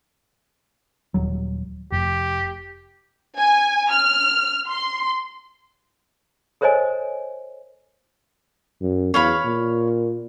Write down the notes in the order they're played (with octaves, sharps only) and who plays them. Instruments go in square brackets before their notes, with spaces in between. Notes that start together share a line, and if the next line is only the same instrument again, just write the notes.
[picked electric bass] D#1 F#3
[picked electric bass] F1 [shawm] G4
[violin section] G#5
F6
C6
[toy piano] A4 A#4 C5 C#5 D#5 G#5
[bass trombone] F#2
[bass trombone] E2 [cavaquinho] C#5 F5 B5
[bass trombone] A#2